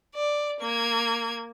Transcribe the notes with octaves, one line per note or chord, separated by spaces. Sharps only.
D5
A#3 G#6